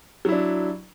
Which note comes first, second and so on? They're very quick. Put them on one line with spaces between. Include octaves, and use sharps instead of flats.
F#3 E4 D4